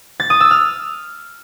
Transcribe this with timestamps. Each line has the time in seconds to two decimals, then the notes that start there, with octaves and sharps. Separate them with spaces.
0.20 A6
0.30 D#6
0.40 E6
0.51 F6